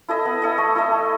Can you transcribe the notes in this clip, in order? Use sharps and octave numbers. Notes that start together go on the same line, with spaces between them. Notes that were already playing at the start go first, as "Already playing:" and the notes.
E4 A4 D#5
B3
E4 A4 D#5
A3
E4 A4 D#5
A3